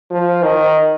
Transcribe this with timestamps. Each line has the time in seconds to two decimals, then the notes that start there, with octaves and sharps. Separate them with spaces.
0.11 F3
0.44 D#3